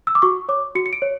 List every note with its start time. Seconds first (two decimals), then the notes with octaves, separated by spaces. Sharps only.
0.07 E6
0.15 D6
0.22 F#4 C#6
0.49 C#5 D6
0.75 F#4 C#7
0.86 C#7
0.93 D7
1.02 C#5